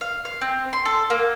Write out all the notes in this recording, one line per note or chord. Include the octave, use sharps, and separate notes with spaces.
F5
F5
C4
C6
A4
A#3